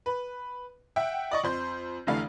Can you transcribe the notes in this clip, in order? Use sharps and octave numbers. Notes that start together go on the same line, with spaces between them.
B4
E5 F#5 G5
D5 D#5 C#6
F2 C5 G6
F1 D3 E3 A3 F5 B5